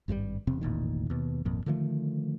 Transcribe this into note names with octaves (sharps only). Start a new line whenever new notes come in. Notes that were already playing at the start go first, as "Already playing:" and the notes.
G#1 G2 B2 G3
E1 C3 C4
E1 A1 A#2 D#3
D#2 B2
G#1 F2 A#2
D3 D#3 F3 A3